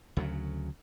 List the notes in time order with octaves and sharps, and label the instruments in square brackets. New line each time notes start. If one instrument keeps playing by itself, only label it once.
[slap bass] D2 C#3 F#3